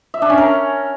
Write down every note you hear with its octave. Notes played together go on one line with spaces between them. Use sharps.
E5
D4
C#4
A#4